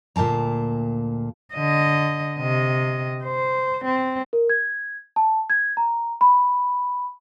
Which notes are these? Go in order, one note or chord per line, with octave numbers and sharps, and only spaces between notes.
D2 A#2 A#3 A5 A#5
D3 D#5
C3 D#5
C5
C4
A#4
G#6
A5
G#6
A#5
B5